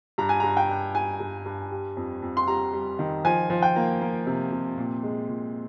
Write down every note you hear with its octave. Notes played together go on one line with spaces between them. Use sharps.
G2 A#5
G#5
G2 A#5
G5
G2
G2 G#5
G2
G2
G3
F2
F2
C6
G3 A#5
G3
D#3
F3 G#5
F3
G5
A#3
A#3
C3
C3
A#2
G#3
A#2